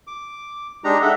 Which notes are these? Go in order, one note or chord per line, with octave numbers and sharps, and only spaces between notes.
D6
G#3 D4 D#4 G4 A#5
A4 E5 F#5